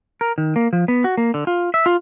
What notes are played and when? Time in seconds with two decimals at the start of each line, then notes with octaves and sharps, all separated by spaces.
0.21 A#4
0.38 D#3
0.56 A#3
0.73 F3
0.88 B3
1.04 F#4
1.17 A#3
1.34 D3
1.47 F4
1.74 E5
1.86 F4